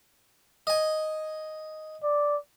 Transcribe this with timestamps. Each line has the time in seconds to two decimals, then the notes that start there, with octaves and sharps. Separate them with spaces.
0.67 D#5 G#5
2.03 D5